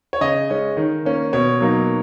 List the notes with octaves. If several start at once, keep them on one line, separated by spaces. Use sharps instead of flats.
C#5
C#3 D#5
G#3 C#4
D#3
A#3 C#4
B2 C#5
F#3 A#3 D#4